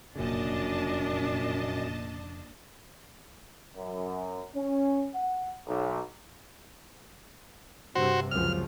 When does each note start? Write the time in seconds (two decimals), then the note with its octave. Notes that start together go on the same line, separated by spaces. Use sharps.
0.16 F1 F#2 A#2 C#3 D4 D#5 A5
3.76 F#2
4.55 C#4
5.14 F#5
5.67 B1
7.96 G2 C3 F#4 C5
8.31 C#2 F#2 F3 F6